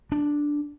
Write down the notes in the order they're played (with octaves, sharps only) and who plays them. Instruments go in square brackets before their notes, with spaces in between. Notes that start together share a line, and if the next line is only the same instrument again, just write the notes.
[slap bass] D4